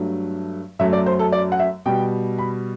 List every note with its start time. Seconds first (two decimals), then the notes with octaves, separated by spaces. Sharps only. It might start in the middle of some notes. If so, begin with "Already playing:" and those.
Already playing: G2 F#3 A3
0.79 F#2 F#3 A3 E5
0.93 D5
1.06 C5
1.19 A4
1.32 D5
1.52 F#5
1.59 E5
1.86 B2 G3 G5
2.38 B5